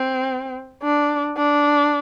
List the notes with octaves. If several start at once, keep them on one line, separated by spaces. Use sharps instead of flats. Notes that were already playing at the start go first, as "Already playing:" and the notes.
Already playing: C4
D4
D4